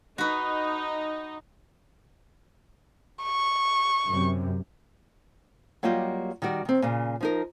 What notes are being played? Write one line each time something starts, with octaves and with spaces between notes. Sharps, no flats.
D#4 F#4 B4
C#6
F#2 C3
F#3 G3 A#3 F4 G4 D#5
D#3 G3 F#4 D5
D#3 C4
A#2 C#3
F3 D#4 A#4